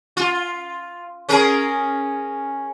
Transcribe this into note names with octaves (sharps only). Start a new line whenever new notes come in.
F4
C#4 G#4 A#4